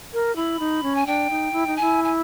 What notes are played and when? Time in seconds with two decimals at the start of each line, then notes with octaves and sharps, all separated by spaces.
0.14 A#4
0.36 E4 B5
0.60 D#4
0.83 C#4
0.95 G#5
1.06 D4 G5
1.30 D#4
1.53 E4
1.67 D#4
1.76 E4 G#5
2.04 G#5